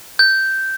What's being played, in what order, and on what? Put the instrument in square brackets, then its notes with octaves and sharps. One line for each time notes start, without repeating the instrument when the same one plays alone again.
[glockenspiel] G6